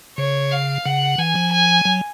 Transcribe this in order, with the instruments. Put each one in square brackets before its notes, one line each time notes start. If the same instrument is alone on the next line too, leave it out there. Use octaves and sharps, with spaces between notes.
[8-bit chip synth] C#3 [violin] C#5
[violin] F5
[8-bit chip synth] C#3 [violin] F#5
[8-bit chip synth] E3 [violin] G#5
[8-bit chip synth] F3
[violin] G#5
[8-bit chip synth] F#3